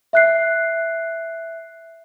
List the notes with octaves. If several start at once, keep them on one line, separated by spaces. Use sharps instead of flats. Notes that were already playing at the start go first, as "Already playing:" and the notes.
E5 F#6 C7